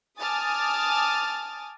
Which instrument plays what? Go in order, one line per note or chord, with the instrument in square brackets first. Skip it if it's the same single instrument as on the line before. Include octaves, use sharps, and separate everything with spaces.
[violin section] G#5 A5 D6 D#6 F6 A6